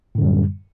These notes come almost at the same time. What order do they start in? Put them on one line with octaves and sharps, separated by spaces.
A2 D3 F#2 G3